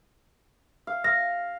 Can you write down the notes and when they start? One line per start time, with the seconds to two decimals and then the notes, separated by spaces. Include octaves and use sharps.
0.87 F5
1.04 F5 A#6